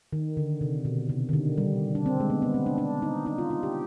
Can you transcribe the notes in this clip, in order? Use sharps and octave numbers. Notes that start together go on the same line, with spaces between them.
D#3
D3
C3
B2
C3
D#3
D3
G3
D4
C4
G#3
B3
B3
C4
D4
D4
D#4
D#4
F4
F4
G4